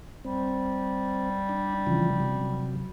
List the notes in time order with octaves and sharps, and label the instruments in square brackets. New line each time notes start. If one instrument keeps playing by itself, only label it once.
[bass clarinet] G3 [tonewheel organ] C4
[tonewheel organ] D4
C#3 E3 F3
C3 F#3